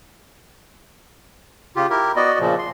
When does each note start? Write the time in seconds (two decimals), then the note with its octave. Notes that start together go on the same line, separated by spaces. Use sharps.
1.76 C#3 F4 G4
1.90 E4 G4 A#4
2.16 B3 F#4 D5 D#5
2.40 A#2 C#3 F3
2.58 C6